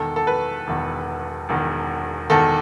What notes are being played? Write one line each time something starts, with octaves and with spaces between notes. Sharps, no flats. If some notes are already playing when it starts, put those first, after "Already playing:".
Already playing: E1 E2 D#3 A4
A4
B4
E1 E2 D#3
E1 E2 D#3
E1 E2 D#3 A4